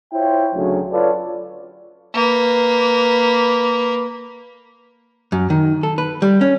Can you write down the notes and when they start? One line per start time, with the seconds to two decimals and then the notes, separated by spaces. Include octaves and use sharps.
0.13 E4 F4 C5 C#5 G5
0.55 D2 C#3 F#3
0.92 F4 A4 B4 C#5 D5
2.14 A#3 B4
5.32 F#2
5.50 D#3
5.83 A4
5.98 B4
6.22 G3
6.41 C#4